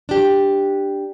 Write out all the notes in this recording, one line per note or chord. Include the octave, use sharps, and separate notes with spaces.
D4 G4